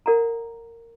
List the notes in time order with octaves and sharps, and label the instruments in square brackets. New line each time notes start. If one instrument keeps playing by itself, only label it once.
[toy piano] A#4 D5 F#5 A#5